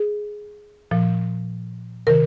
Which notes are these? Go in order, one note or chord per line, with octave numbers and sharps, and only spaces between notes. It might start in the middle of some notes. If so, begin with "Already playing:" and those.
Already playing: G#4
A#2 F3
C3 D#3 A#4